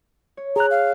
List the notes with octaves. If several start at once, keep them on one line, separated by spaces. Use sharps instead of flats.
C#5
G#4 A#5 F#6
F5